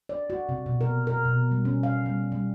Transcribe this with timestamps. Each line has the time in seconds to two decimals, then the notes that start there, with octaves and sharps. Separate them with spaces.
0.09 D5
0.30 F#4
0.49 C3
0.66 B2
0.81 A#4
1.07 A#4
1.25 B2
1.51 G3
1.65 C#4
1.83 F5
2.06 G3
2.32 G3